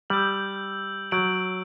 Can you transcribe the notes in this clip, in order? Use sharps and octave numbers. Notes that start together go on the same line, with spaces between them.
G3 E6 G6 D7 F#7
F#3 G6 D7 F#7